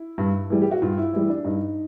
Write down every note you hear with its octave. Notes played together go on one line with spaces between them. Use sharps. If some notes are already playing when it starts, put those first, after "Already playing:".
Already playing: E4
G2
E3 G3
G4
F#4
G2 F4
E4
E3 G3 E4
D4
G2 D#4